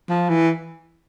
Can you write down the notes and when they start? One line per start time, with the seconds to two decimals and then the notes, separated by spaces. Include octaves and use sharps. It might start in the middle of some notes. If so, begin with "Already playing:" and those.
0.09 F3
0.30 E3